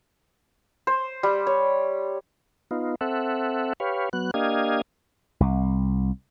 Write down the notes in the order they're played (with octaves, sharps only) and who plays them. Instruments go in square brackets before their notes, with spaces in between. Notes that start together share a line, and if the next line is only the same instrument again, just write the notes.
[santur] C5
G3
C#5
[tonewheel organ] B3 D#4 F4
C4 A4 E5 F#5
G4 B4 C#5 F5
F#3 B3 F#6
A#3 D4 G4 D#5 F5 G#6
[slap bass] C2